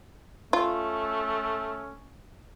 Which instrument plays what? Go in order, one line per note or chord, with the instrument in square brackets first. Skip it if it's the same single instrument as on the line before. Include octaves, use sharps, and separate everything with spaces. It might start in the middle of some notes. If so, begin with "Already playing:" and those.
[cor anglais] A3 [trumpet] C#4 [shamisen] F4